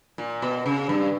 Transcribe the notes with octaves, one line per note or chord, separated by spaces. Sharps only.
A#2
B2
C#3
G2